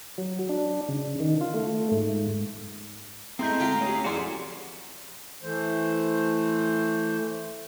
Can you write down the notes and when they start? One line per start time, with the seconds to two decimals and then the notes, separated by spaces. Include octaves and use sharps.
0.18 F#3
0.49 D4
0.88 C#3
1.20 D#3
1.41 F4
1.54 A3
1.91 G#2
3.39 G#3 A3 C4 E4 A#5 C6 G6
3.60 D2 F4 G5
3.81 C#4 G4 G#4
4.04 F2 E3 F#4 G#4 D5 F#5 C6
5.43 E3 A3 C5